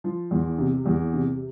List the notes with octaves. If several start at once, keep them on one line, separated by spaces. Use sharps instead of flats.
F3
E2
C3
E2
C3